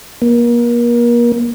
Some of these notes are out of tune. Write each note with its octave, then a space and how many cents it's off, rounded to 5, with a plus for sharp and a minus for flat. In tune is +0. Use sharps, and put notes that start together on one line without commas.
A#3 +35